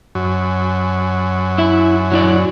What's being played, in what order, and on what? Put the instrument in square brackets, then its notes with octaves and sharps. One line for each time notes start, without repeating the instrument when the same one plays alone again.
[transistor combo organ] F#2
[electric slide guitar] E4 E5
F#3 E4 D5